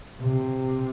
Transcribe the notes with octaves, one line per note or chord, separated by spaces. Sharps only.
C3